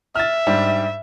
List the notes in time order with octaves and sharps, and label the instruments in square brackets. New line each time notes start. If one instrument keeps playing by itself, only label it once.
[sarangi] E5 [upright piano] F6 A6
[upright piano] G#2 G3 D4